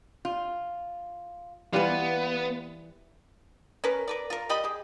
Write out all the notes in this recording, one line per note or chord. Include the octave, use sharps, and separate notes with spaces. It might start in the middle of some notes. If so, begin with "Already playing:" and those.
F4
E3 G3 B3 F4 B4 F5
C#4 A#4 B4
A#4 B4 D5
F4 A#4
G3 G4 D#5 B5
G4 G#4